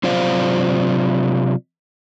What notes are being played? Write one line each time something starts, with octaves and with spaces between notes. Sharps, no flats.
C3 F#3 F4 C5 D5 F5